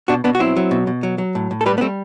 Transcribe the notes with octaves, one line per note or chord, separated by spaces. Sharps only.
B2 D4 F#4
B2 B3 D4
F#4
F#3 C4 E4
F#3
B2
B2
F#3
F#3
A2
A2
A4
G3 G4 B4
B3
G3 A3 C4